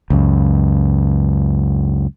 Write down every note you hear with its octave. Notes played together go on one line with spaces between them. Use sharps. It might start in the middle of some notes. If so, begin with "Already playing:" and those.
C#2 F#2